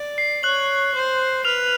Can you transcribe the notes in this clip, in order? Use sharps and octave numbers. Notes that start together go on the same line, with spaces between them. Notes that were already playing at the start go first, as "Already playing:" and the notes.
Already playing: D5
C7
C#5 F#6 F#7
C5
B4 F6 F7